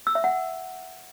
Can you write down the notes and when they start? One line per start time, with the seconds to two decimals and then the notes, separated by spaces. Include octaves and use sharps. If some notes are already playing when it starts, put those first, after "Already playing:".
0.07 E6
0.15 E5
0.24 F#5